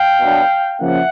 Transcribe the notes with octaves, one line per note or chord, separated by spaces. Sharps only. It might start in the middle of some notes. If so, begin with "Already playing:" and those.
Already playing: F5 G5
B2 F#3 B3 D4
C#3 F3 A#3 C#4 E5 F#5